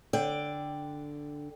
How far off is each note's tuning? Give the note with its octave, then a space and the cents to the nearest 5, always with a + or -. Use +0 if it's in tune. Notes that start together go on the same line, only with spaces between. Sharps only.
D3 +0 D5 +0 G5 +0